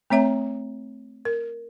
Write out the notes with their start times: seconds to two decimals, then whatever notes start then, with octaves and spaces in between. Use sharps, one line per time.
0.10 A3 C4 C#5 E5 A#5
1.25 A#4